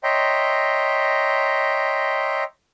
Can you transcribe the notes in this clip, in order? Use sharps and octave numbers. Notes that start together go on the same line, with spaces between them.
C#5 D#5 E5 G5 A#5 C6